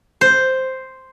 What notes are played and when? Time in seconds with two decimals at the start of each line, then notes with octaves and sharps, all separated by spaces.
0.21 C5